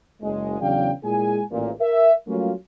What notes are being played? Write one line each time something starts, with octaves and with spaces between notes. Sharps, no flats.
F#1 G#3
E2 C#3 F#3 D4 F5 G5
A#2 G#3 E4 G#4 G#5
A1 A#2
A#4 E5
F#3 G3 A3 A#3 C#4 F4